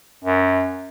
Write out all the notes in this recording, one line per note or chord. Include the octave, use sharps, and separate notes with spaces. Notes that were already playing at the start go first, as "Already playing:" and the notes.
F#2